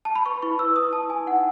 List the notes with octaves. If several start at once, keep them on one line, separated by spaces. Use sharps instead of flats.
A5
B5
B4 C#6
E4 C#6
B4 E6
E4 D#6
E4 A5
E4 G#5
D#4 F#5